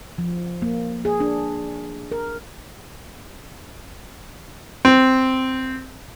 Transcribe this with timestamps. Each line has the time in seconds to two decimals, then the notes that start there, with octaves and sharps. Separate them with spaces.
0.18 F3
0.62 A#3
1.05 G#4
1.20 D4
2.12 A#4
4.85 C4